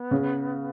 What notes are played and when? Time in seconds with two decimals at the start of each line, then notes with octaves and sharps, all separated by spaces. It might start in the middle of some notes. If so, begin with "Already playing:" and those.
Already playing: B3
0.11 C#3